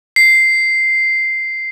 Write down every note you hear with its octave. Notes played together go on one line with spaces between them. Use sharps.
C7